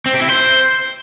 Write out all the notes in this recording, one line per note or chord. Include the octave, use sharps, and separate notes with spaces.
C4
G4
E4
C5